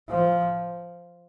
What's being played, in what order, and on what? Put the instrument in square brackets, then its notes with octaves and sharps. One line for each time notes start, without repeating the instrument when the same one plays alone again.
[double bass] F3